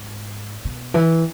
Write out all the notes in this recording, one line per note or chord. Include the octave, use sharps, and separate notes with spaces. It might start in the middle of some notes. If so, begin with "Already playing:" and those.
Already playing: G#2
B2
E3